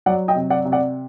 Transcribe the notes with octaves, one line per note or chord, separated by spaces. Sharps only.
F#3 D5 F#5
D#5 G5
C3
D5 F#5
C3
D5 F#5